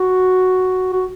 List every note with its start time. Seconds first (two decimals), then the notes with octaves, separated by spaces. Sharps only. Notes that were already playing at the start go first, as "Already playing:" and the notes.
Already playing: F#4
0.93 F#4